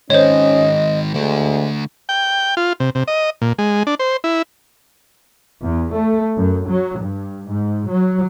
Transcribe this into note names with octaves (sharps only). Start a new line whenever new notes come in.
D#3 G#3 C#4 C5 C#5 D#5
D2 D3 G#3 A3
G5
F4
C3
C3
D#5
A#2
G#3
D4
C5
E4
E2
A3
F#2
F#3
G2
G#2
F#3